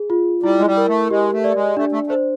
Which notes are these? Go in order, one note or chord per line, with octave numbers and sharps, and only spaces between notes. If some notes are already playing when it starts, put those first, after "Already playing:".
Already playing: G#4
F4
G3 E4
G#3
G3
A#4
A3
G#3 G4
A3
D5
G#3
A3 D4
A3
A3
C5